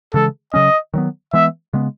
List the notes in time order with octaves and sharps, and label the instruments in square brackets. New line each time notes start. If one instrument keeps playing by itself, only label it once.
[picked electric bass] C#3 E3 G#3 [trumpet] A4
[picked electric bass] C#3 F#3 C#4 [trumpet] D#5
[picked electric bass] D#3 F#3 B3
[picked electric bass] E3 G#3 B3 [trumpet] E5
[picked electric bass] C#3 G#3 B3